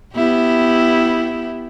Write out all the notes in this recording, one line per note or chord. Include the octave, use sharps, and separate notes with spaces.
B3 E4 G4